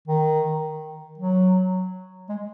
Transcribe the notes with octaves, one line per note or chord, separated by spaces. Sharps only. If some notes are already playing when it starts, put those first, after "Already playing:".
D#3
F#3
G#3